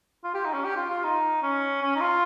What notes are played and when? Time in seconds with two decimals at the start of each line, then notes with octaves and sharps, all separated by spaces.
0.24 F4
0.35 G4
0.45 D#4
0.54 C#4
0.65 G4
0.77 F4
0.90 F4
1.04 D#4
1.43 C#4
1.82 C#4
1.96 D#4
2.01 F4